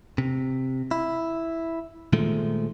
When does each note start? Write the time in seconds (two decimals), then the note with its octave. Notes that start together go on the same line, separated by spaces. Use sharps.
0.18 C3
0.91 E4
2.13 A#2 D#3 F3 G#3 A3